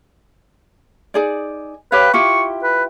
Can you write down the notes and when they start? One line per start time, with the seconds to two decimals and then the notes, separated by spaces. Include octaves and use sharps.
1.14 D#4 G#4 D5
1.92 G4 B4 C#5 F5
2.13 E4 F4 G4 C#6
2.64 B4